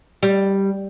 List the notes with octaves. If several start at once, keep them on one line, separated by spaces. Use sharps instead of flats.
G3